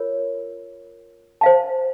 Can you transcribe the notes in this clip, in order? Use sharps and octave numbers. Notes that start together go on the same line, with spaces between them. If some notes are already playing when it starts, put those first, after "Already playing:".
Already playing: F4 A#4 C#5
C5 F5 A5